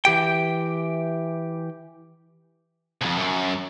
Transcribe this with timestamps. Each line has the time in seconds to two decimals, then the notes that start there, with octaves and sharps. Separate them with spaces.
0.05 E3 G4 G5
3.02 C2 F2
3.19 F#2